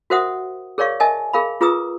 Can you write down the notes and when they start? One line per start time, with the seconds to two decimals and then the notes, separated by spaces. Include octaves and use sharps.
0.10 F#4 A#4 C5 E5 F#5 D#6
0.78 G#4 A#4 C#5 D5 F5 C#6
1.00 A#4 D#5 E5 G#5 A5
1.33 G#4 A#4 F5 B5
1.61 F4 G#4 B4 A#5 D#6 E6